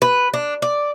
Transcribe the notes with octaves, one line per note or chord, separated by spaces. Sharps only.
B4
D4
D5